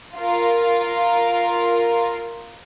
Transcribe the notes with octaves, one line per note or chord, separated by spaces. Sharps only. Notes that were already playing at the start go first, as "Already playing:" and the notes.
F4 A#4